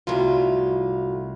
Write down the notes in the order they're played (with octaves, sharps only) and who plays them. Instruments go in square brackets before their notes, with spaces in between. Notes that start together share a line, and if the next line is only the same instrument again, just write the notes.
[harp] C2 [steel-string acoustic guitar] F#2 A2 F4